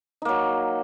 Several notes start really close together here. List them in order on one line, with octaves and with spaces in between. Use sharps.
D#4 A#3 F#3